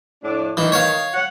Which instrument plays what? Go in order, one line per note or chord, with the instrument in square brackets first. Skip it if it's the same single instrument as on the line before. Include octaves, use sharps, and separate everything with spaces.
[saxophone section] F2 A2 D4
[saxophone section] D#3 [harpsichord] E3
[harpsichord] C#5 F5
[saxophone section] C#5 F#5